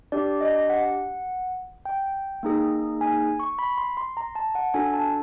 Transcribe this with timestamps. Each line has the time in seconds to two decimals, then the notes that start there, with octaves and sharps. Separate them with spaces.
0.12 D4 G4 D5
0.41 D#5
0.70 F#5
1.85 G5
2.43 A#3 D#4 G#4
3.01 G#5
3.40 C#6
3.59 B5
3.78 C6
3.97 C6
4.17 A#5
4.35 A5
4.55 F#5
4.74 D4 F#4 A4 G#5
4.94 A5